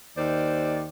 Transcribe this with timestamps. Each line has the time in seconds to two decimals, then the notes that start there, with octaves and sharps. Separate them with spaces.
0.16 D#2 D#3 C5 D5